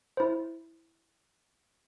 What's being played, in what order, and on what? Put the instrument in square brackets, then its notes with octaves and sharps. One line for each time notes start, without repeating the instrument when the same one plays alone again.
[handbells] E4 C5